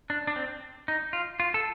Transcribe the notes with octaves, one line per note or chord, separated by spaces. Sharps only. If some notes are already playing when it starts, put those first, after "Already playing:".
D4
D4
C4
D#4
F4
F4
A4